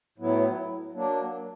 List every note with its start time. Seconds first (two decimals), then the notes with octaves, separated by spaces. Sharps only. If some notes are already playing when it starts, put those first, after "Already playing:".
0.18 A2 F#3 B3 E4
0.92 F#3 A#3 D4